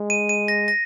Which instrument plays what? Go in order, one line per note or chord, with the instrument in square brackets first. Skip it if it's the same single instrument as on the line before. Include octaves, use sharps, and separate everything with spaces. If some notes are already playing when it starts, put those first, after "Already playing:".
Already playing: [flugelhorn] G#3
[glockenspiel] D#7
D#7
A#6
A#6